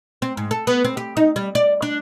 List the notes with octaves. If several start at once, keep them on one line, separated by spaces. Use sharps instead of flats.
C4
G#2
A4
B3
C4
G4
D#4
G3
D5
D4